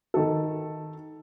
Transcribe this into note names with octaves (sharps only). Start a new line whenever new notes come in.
D#3 A4